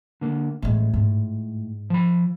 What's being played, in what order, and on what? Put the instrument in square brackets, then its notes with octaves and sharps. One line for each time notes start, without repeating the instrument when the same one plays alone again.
[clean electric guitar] D3 A#3
[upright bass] A1 G#3 [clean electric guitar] A2
[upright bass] G#2
[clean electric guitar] F3 B5